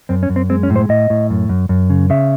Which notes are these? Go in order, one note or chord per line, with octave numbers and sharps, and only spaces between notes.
F#2 C4
C#4
F#2
C4
G#3 C4
C#4
A2
C5
A2 D#5
A2
F#2
F#2
F#2
C#3
C#3 E5